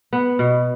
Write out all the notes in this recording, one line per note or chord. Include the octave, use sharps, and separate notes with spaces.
B3
B2